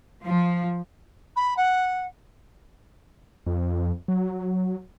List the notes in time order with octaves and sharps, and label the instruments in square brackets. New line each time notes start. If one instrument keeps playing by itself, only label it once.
[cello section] F3
[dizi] B5
F#5
[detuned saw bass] F2
F#3